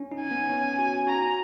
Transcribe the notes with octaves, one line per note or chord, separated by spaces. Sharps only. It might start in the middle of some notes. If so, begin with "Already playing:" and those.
Already playing: C#4
D#4
G#5
B3
C#4
F#4
F#4 A#5